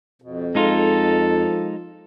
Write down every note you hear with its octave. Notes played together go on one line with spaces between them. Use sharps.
F2 B2
F3 G#3 D#4 F4 A4